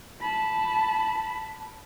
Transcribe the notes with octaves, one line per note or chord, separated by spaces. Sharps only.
A5 B5